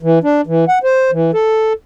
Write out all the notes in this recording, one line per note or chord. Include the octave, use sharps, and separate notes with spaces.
E3
D4
E3
F#5
C5
E3
A4